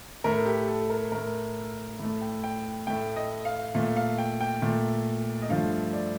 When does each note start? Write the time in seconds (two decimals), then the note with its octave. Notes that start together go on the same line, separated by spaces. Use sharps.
0.24 A2 A3 A#4
0.46 G4
0.68 A4
0.90 A#4
1.12 A2 A3 A#4
1.99 A2 A3
2.21 G5
2.44 G5
2.87 A2 A3 G5
3.16 D#5
3.45 F5
3.75 A#2 A3 F5
3.96 F5
4.18 G5
4.41 G5
4.62 A#2 A3
5.42 D#5
5.49 G2 F3 A3 F5
5.93 D5